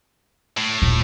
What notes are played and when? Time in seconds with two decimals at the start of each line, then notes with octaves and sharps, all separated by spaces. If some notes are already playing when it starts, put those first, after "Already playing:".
0.57 A2
0.82 D#1